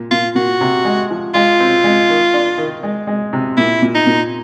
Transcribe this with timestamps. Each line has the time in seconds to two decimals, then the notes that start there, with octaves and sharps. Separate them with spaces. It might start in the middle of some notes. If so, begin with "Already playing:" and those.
Already playing: A#2
0.11 A#2 F4
0.35 A#2 F#4
0.61 C3
0.85 G#3
1.11 F3
1.34 G#3 F4
1.60 C4
1.84 G#3
2.10 D#3
2.34 D4
2.58 D#3
2.83 G#3
3.07 G#3
3.33 C3
3.57 A#2 E4
3.82 A#2
3.95 D#4
4.06 A#2